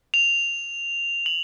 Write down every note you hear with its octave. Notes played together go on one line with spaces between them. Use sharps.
F7
F#7